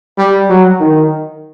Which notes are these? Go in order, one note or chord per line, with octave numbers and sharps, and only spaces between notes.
G3
F#3
D#3